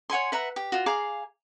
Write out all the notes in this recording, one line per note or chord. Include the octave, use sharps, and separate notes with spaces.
C#5 F#5 G#5 C6
B4 E5 F#5 A#5
G4
F4 F#4
G#4 F5 A#5 D6